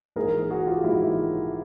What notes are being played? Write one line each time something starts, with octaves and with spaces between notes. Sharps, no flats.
A#1 G#2 E3 G#4 A#4
F#4 G#4
F4 G4
A#1 G#2 E3 E4 F#4